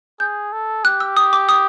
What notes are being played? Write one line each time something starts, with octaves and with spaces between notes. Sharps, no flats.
G#4 G6
A4
G4 F#6
E6
D#6
D6
D#6